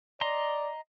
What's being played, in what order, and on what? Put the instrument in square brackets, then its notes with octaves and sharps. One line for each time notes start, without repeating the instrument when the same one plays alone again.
[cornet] D5 [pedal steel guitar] D#5 A#5 C6